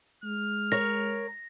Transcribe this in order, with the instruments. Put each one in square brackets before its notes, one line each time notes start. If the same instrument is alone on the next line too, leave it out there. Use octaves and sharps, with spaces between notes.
[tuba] G#3 [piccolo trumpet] F6
[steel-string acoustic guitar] A#4 C#5 [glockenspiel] A#6